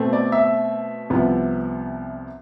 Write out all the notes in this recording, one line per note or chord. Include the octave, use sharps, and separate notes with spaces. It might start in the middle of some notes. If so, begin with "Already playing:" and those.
Already playing: B2 A3 C4
D5
E5
C2 C3 F3 B3